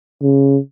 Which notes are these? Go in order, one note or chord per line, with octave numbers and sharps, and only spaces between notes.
C#3